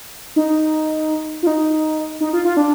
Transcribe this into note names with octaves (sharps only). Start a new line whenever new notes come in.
D#4
F4
D#4
D#4
F4
F4
D4